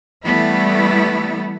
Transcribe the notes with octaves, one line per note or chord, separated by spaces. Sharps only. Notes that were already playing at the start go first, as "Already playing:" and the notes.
E3 G3 A3 B3 E4